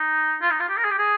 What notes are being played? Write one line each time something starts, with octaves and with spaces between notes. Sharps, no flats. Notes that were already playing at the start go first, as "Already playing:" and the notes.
Already playing: D#4
F4
D#4
F4
G4
A#4
G#4
G4
G#4